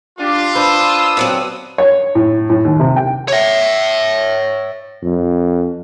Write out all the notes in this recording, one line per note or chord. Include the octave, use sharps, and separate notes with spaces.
D4 F4 G4
D4 B4 C5 D#6 E6
D3 F#3 C4
C#5
A2
A2
D#2
C3
G5
C#5 E5
F2